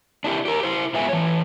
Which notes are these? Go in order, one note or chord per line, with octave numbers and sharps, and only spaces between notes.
D4 E4 G4
G4 A#4
E4 C5
G#2 B3 F4 E5 G#5
E3 C#5